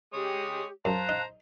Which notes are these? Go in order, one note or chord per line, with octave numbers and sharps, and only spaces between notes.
G#3 G4 C#5 D#6
F#2 C5 F5 A5 A#5 F#6
D#4